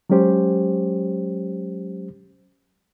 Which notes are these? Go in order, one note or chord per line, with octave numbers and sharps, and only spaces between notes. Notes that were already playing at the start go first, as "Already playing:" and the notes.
F#3 G#3 C#4 G4 C5